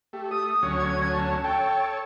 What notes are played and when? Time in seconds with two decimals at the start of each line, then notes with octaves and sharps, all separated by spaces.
0.13 A3 G4
0.31 D#6
0.63 D2 F#3 C#4
0.79 G#6
1.13 A5
1.44 A4 C#5 G5